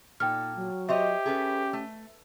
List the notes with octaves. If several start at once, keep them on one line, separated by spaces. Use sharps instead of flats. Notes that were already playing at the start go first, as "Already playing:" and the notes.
A#2 D#4 A4 G5 F6
F#3
G4 C5 C#5 D#5 E5
C#4 G#4 A4 B4
A3